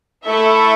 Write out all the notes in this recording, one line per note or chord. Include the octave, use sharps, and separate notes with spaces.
A3 E4 A4 E5